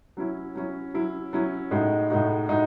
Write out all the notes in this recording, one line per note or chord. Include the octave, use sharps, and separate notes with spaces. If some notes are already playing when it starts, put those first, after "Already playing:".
F#3 C#4 E4
F#3 C#4 E4
F#3 C#4 E4
F#3 C#4 E4
A2 G#3 D#4 F#4
A2 G#3 D#4 F#4
A2 G#3 D#4 F#4